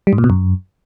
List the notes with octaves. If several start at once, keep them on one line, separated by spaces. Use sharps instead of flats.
G3
G#2
A#2
B2
F#2